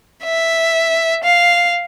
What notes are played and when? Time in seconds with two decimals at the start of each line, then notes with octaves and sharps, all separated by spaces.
0.24 E5
1.23 F5